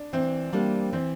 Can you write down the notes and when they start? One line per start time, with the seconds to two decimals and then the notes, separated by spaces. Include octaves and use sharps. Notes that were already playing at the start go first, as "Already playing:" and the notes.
Already playing: D4
0.13 E3 C4
0.53 G3 A#3 D4
0.93 E3 C4